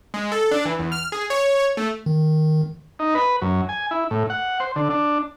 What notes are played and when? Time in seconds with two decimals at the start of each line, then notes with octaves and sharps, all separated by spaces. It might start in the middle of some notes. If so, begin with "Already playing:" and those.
0.14 G#3
0.32 A4
0.51 D4
0.65 E3
0.79 E2
0.92 F6
1.12 G#4
1.30 C#5
1.77 A3
2.06 D#3
2.99 D#4
3.15 B4
3.42 F#2
3.69 G#5
3.91 E4
4.11 A2
4.30 F#5
4.60 C5
4.76 D3
4.90 D4